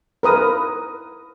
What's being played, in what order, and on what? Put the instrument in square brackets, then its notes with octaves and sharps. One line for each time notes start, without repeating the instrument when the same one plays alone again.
[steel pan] A#4 B4 D#6